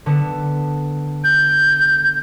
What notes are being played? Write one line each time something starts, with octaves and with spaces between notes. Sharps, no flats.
D3 B3 A4
G6